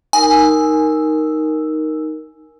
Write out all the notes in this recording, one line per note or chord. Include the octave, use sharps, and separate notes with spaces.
D#4 A#4 G#5 E6